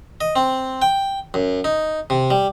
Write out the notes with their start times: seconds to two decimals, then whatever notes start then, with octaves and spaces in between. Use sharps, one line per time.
0.21 D#5
0.36 C4
0.82 G5
1.34 F#2
1.64 D#4
2.10 C3
2.31 G3